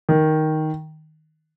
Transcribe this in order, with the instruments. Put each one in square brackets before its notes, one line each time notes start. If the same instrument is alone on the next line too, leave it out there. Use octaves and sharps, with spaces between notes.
[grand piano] D#3